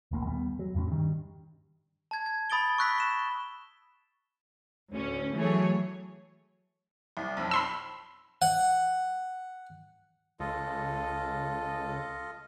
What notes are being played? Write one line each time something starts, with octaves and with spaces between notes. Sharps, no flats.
D1 A#1 A#3
D#2 G3 B3
F#3
E2 A2 C3 C#4
G2 D#3
A5 G#6
G#6
B5 D#6 A6 D7 G7
C#6 E6 F#6 A#6 B6
E7 G7
D2 A2 C#4
E3 F#3 A3 G#4 C#5
C2
B1 F2
B5 C6 E6
F#5
C#2 F4 A4 D#5